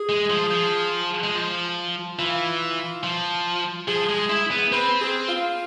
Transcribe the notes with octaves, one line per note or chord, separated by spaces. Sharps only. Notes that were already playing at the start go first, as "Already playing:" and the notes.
Already playing: G#4
G#3
F3
F3
G#3
F3
E3 F4
F3
F3 G#4
G#3
E4
B3
C4 B4
G#4
F4